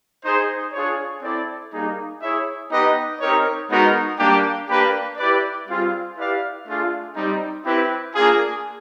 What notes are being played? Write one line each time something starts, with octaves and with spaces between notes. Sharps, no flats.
D#4 G#4 C5
D4 F4 G#4 C#5
C4 E4 A4 D5
G3 A#3 D#4 G#4
E4 G#4 C#5 E5
B3 D#4 G4 B4 D#5
C4 D#4 G4 A#4 C#5
G#3 B3 D#4 F#4 A#4
G3 A#3 D4 G4
A#3 D4 G4 B4
E4 G4 B4 D5
G3 C4 F4 G#4
E4 G4 B4 D5 F5
A3 D4 F4 G#4
G3 C4 D#4
C4 E4 G4 B4
A#3 D4 F4 G#4